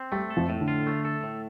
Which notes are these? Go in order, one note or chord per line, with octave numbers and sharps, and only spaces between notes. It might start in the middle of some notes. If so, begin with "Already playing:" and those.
Already playing: C4
G3 A3 G4
A4
F2 F3
A2
D3
F4
A3
A4
A2